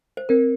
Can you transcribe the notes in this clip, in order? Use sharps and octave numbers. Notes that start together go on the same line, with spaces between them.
C5
C4 A#4